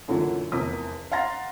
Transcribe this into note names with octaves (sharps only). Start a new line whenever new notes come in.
F#2 A#2 D3 E3 F#3
F1 E2 A#4 D#6 B6
F5 F#5 A#5 C6 A6 A#6